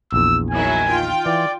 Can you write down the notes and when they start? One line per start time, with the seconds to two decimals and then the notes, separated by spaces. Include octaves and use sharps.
0.12 A#1 E2 E6
0.50 D#3 F#3 E4 G#5
0.89 F4 G5
1.26 E3 D5